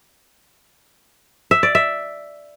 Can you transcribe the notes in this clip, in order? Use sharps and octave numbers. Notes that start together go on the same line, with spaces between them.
E5
D5
E5